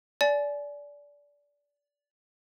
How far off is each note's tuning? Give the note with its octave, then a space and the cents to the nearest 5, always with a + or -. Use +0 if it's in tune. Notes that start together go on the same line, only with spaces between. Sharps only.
D5 -20 G#5 +30